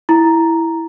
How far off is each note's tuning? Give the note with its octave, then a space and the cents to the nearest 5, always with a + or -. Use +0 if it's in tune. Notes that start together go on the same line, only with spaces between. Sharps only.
E4 +0 A#5 +0